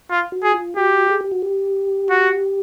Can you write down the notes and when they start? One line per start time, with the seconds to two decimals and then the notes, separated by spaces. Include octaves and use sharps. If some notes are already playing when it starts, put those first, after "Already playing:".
0.10 F4
0.32 F#4
0.43 G#4
0.54 F4
0.76 F#4 G4
1.10 G#4
1.21 G4
1.32 F#4
1.42 G4
2.10 F#4